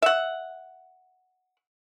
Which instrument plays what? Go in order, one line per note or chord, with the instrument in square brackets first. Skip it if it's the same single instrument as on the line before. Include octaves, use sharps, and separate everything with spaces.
[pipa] E5 F#5